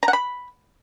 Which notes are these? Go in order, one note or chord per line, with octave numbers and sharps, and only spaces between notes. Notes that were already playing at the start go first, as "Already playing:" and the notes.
A#5
F#5
B5